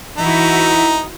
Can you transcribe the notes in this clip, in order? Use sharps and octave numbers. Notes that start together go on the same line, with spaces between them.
E3 D#4 E4 F#4